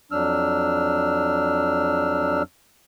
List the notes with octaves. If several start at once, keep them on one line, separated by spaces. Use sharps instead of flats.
F2 F#3 D4 E6 F6